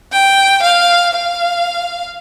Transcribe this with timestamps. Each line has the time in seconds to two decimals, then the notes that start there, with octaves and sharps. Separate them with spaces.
0.12 G5
0.62 F5
1.14 F5